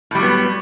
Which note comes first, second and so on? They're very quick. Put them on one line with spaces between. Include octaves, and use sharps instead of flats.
A2 G3 F#3 B3